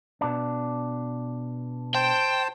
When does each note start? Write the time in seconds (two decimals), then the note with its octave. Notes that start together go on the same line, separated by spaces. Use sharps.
0.21 B2 D4
1.94 C5 G5 A5